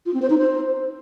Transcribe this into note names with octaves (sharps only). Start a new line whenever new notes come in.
F4
C4
C5
D#4
C5